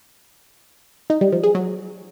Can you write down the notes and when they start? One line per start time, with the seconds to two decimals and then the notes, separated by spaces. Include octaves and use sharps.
1.10 D#4
1.21 G3
1.32 F3
1.43 G#4
1.55 F#3